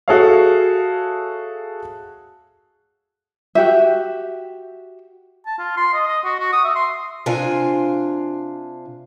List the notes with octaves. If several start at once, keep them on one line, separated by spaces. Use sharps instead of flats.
F#4 G#4 A4 C#5 E5 F5
F#4 G4 E5
A5
F4
C6
D#5
D#5
F#4
F#4
D#6
E5
C6
C3 D4 F4 F5 G#5